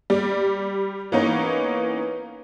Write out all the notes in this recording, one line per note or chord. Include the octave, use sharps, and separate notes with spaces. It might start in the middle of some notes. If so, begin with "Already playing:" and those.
G3 D5
E3 A#3 B3 C#4 D#4